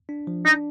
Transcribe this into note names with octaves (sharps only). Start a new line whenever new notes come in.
D4
F3
D4 D#4